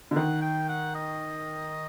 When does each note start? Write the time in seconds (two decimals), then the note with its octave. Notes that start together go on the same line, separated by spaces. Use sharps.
0.11 D3
0.16 D#3 F#5
0.42 G5
0.69 F#5
0.95 D#5